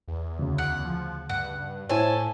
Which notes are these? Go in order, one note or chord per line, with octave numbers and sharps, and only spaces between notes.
E2
D2 C#3
F#5
F3
G2 F#5
A2 E4 A4 C5 C#5 G#5